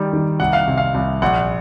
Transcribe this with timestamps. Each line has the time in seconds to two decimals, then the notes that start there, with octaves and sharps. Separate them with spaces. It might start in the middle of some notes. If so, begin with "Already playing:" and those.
Already playing: D#3 G3
0.13 D#3
0.40 C2 F#5
0.53 F5
0.67 C3
0.77 F5
0.94 C2
1.22 A#1 F#5